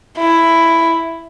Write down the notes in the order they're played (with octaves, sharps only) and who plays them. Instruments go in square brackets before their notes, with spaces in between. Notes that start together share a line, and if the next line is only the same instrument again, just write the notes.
[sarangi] E4